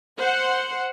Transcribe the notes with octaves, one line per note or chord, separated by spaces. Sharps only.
C5 F#5